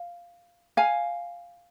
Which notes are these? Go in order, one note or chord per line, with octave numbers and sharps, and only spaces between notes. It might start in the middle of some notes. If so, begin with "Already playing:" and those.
Already playing: F5
F5 G#5